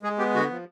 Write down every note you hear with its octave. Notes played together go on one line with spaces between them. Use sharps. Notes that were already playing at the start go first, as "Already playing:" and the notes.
G#3 G#4
B3 G4
D3 F#4
F3